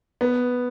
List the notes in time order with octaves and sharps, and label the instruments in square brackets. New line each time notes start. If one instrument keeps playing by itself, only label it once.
[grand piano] B3